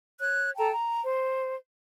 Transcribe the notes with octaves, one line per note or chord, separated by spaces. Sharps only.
C#5 F#6
A4 G5 A5 A#5
A#5
C5